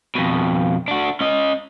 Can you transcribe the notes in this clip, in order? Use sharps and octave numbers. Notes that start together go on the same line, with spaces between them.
F2 B2
D4 F#4
C#4 D#5